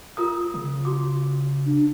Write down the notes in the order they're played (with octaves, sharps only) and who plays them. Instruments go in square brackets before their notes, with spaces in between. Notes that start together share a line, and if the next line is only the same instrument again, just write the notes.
[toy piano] F4 A#4 D#6
[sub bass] C#3
[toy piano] F#4 D6
[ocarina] D4